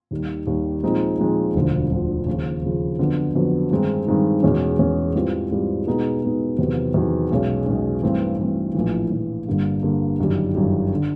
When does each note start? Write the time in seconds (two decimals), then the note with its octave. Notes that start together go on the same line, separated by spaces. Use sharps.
0.11 D#2 D#3 G3
0.47 D#2 D#3 G3
0.83 A#2 F3 G#3 C4 D#4
1.19 A#2 F3 G#3 C4 D#4
1.54 E1 D2 D3 F3
1.91 E1 D2 D3 F3
2.26 D#2 C#3 F3
2.62 D#2 C#3 F3
2.99 F2 D3 F#3 B3
3.35 F2 D3 F#3 B3
3.71 G2 D#3 G#3 C4 D#4
4.06 G2 D#3 G#3 C4 D#4
4.43 E2 B2 G#3 C#4
4.79 E2 B2 G#3 C#4
5.15 G#2 E3 G3 C4 F4
5.51 G#2 E3 G3 C4 F4
5.86 B2 G#3 B3 D#4
6.23 B2 G#3 B3 D#4
6.59 E2 C3 D#3 F#3 B3
6.94 E2 C3 D#3 F#3 B3
7.31 B1 B2 G#3 C#4
7.66 B1 B2 G#3 C#4
8.03 G2 E3 A3 C4
8.38 G2 E3 A3 C4
8.75 A#1 A2 E3
9.10 A#1 A2 E3
9.47 G1 G2 D3 G3 A#3
9.83 G1 G2 D3 G3 A#3
10.19 G1 F#2 D#3 G3
10.55 G1 F#2 D#3 G3
10.94 D3